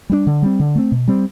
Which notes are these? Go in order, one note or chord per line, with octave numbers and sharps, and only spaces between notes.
G3 B3 D4
D3
G3 C4
D3
A3 C4
B2
G3 C4